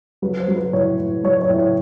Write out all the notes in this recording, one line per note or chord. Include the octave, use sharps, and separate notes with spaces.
F#3 B4
C5
F#3
B4
A2 C#5
A2
F#3 C#5
C#5
A2
C#5